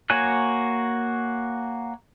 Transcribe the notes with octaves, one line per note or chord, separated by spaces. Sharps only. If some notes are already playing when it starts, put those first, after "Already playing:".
A#3 F#4 C#5 G#5 F#6